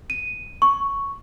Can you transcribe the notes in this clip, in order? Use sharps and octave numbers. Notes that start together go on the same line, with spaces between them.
D#7
C#6